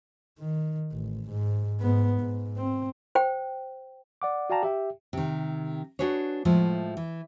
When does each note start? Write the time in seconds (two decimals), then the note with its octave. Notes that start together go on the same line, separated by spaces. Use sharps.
0.39 D#3
0.92 A1
1.30 G#2
1.80 G#2 B3
2.20 G#2
2.57 C4
3.15 C5 G5
4.22 D5 F#5 D6
4.50 F#4 D5 F5 G5 A5 A#5
4.63 G4 E5 G5
5.13 C3 D#3
5.99 D4 F#4 G#4 B4 C#5
6.45 A2 F3 G#3 A3
6.97 E3